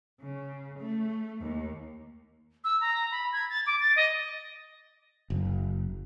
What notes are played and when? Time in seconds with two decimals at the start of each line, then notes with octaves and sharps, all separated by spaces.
0.21 C#3
0.78 A3
1.41 D#2
2.64 E6
2.81 A#5
3.11 B5
3.33 G#6
3.50 A6
3.66 D6
3.80 A6
3.96 D#5
5.30 F#1